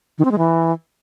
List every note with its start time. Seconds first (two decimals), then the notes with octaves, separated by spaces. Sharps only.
0.18 D#3
0.25 C4
0.32 G#3
0.38 E3